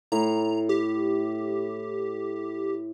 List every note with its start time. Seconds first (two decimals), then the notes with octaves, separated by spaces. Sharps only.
0.12 A2 A#5
0.69 G4